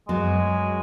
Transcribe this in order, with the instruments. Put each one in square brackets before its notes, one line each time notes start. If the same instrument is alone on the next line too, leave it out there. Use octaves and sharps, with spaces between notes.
[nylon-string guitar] F#2 F#3 B3 [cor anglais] G#3